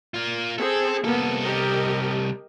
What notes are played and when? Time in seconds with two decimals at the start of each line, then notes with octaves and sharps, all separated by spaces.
0.14 A#3 F4
0.58 C4 G#4 A4
1.04 C2 A#3 B3 A4
1.43 G4 A#4 D#5